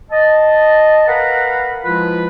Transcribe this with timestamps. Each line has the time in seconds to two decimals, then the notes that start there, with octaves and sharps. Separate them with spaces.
0.11 D#5 A5
1.07 A#4 B4 F5 F#5 A#5 B5
1.84 F3 G#3 E4 F4 B4